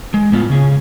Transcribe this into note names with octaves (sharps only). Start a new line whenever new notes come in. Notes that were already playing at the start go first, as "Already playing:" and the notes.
G#3
A2 B3 F4
C#3 G#4